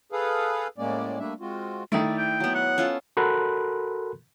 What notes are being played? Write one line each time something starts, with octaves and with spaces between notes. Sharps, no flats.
G#4 A4 B4 F5
A2 G#3 A#3 C#4 D5
G3 A3 A#3 D4 E5
G#3 C4 F4 F#4
D#3 A3 E4 D5
G5
F#3 B3
F#5
C#4 F4 A4
F#4 A4 A#4 B5 C6 F#6